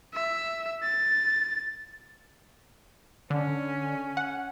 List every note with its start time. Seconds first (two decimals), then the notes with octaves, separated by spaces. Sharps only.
0.14 E5
0.83 A6
3.30 D3 C#4
4.17 F#5